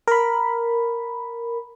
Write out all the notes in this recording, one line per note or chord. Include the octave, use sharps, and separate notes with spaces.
A#4 B5